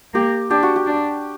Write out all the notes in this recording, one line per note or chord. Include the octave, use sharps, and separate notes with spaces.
A#3 G4
D4 G4
F#4
G4
D4